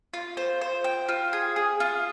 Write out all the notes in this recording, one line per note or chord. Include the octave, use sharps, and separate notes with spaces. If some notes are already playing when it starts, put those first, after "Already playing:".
F4
C5
C5
G5
F4
G#4
G#4
F4